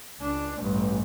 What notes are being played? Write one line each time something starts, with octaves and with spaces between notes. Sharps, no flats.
C#2 D4
A1 G2